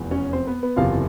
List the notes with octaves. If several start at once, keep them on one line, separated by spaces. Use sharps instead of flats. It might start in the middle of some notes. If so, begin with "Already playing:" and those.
Already playing: F1 E2
C#4 C#5
C4 C5
B3 B4
B3 B4
F#1 E2 C3 F4 F5